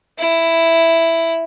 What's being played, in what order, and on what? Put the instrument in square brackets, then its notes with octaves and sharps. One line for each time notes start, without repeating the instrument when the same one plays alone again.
[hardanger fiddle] E4